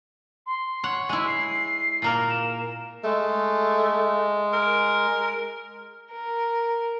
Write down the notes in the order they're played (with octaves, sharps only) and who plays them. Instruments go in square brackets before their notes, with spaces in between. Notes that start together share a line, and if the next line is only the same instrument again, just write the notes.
[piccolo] C6
[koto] C#5 F#5
G#3 E4
[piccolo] C7
[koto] A#2 A#3 A#4
[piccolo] E7
[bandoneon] G#3 [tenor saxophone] A3
[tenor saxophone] A#4
[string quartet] A#4